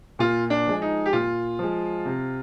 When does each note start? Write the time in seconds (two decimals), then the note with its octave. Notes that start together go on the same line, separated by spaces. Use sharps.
0.19 A#2 F4
0.50 D4
0.67 F3 G#3
0.82 D#4
1.06 G4
1.13 A#2 F4
1.59 F3 G#3
2.05 C3